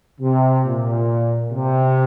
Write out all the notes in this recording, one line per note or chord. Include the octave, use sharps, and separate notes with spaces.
C3
A#2
C3